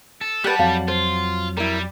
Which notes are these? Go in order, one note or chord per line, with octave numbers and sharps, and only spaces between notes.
A4
G3 G4 B4 F#5 A5
F2 F#3 F5
F4 C5
G3 E4 A#4